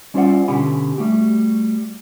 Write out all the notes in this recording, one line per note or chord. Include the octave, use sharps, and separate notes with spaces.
G3 C#4 F4 C5 D5 F#5
B2 D3 C#4 G4 G#5 B5
G3 A3 F#4 G4